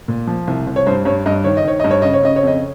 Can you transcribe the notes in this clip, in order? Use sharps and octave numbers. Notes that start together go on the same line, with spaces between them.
A#2
F3
C2
C2
C#5
G2 C5
G2 C#5
G2 D#5
D#3 C#5
D#5
D#3 C#5
G2 D#5
C#5
C#3 D#5
C#5
C#3 D#5
C#5
F2 D#5